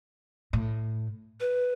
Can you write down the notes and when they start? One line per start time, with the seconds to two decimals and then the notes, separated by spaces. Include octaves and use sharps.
0.53 A2
1.40 B4